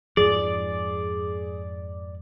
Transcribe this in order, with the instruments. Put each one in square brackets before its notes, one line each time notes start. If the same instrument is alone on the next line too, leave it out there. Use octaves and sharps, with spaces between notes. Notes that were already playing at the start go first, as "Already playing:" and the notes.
[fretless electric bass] F2 G#2 F3 [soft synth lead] G#4 [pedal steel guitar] D5